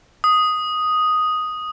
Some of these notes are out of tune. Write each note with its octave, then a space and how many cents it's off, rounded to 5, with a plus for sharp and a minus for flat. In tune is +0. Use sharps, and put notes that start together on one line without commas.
D#6 +0